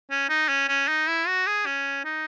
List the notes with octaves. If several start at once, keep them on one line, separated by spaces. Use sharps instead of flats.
C#4
D#4
C#4
C#4
D#4
E4
F#4
G#4
C#4
D#4